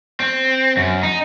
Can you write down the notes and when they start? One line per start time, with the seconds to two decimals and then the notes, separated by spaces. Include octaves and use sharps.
0.20 C4
0.77 F#2
1.03 D#4